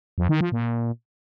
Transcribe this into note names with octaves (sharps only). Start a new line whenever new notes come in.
F2
D#3
F3
A#2